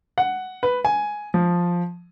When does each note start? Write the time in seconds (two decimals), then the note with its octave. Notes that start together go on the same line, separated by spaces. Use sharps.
0.18 F#5
0.63 B4
0.85 G#5
1.34 F3